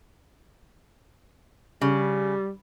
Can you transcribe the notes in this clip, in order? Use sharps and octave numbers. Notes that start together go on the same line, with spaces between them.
C#3 G3